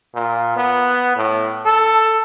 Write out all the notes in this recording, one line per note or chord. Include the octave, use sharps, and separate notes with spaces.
A#2
B3
A2
A4